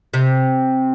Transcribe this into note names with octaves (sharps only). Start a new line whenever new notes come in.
C3